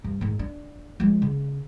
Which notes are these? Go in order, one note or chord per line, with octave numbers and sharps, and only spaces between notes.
G2
G#2 D#3
D4
F3 G#3
C#3